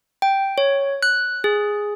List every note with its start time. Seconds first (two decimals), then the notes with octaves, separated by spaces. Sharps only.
0.22 G5
0.58 C#5
1.03 F#6
1.44 G#4